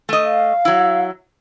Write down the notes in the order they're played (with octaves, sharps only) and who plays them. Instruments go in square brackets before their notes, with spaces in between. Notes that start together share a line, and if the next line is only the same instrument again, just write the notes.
[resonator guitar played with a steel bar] A3 D#5
[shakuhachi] F5
[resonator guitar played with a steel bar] F#3 E4